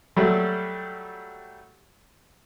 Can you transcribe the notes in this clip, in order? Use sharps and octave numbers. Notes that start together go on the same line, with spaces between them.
F#3 G3 A3